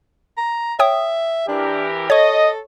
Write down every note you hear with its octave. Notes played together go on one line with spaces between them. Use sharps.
A#5
C#5 E5 G5 D#6
E3 D4 G4 A#4
A4 C#5 D#5 C#6